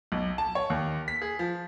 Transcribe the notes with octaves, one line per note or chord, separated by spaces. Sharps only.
B1
A5
C#5
D#2
B6
G#4
F3